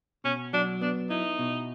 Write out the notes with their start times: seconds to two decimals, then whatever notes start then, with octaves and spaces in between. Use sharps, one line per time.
0.24 B2 C#4
0.53 F#3 D4
0.81 B3 D4
1.10 D#4 E4
1.39 B2